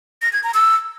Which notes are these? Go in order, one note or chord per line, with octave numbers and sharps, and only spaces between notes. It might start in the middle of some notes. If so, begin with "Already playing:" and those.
A#6
G#6
A#5
E6